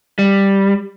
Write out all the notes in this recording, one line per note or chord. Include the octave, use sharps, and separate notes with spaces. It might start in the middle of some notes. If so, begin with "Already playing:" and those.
G3